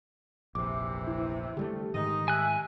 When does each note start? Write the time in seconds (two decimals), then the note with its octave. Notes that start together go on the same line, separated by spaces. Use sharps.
0.55 F1 A#1 C3 E3 D6
1.07 E4
1.57 D3 G3 A3 G4
1.94 G#2 D#3 G#3 D#4 D#5
2.28 E5 G#5 F#6